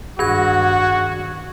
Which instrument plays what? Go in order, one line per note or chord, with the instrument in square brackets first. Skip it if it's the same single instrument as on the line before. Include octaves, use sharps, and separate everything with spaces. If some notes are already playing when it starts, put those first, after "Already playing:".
[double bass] G2 [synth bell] D#3 G#6 [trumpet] F#4